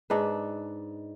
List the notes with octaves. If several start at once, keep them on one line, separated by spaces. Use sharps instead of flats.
G#2 D4 B4